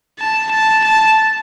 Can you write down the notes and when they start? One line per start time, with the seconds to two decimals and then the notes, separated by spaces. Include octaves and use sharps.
0.20 A5
0.51 A5
0.84 A5